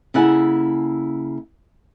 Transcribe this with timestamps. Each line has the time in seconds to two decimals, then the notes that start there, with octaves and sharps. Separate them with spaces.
0.14 C#3 A#3 E4 A4 F#5 G#5